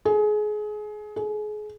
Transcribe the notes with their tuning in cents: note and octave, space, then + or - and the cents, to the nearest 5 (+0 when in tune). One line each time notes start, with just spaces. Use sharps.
G#4 +25
G#4 +30